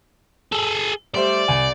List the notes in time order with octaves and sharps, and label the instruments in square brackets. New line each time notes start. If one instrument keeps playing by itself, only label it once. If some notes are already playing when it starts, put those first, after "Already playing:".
[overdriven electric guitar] G#4 A4
[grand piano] G3 A3 C5 [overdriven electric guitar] D5
[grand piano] C2 G#5